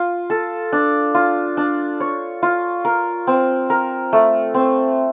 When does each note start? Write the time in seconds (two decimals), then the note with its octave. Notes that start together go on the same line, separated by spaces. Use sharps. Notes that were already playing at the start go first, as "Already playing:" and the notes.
Already playing: F4
0.30 A4
0.72 D4
1.15 F4
1.57 D4
2.00 C#5
2.42 F4
2.85 A#4
3.27 C4
3.70 A#4
4.13 A3
4.54 C4